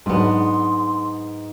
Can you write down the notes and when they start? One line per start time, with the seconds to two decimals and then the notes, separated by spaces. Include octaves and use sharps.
0.06 G#2 F#3 G#3 B3 D4 C6